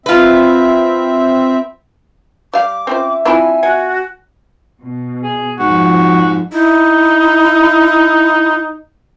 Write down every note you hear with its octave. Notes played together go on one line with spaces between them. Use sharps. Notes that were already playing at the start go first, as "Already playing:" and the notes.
C4 F4 B4 E5
G3 F5 D6
C4 C#4 F4 C5 E5
C4 D4 E4 F4 G#5 B5
F#4 F#5 G#5
B2
G#4
F2 G#2 F3 F#4
D#4 E4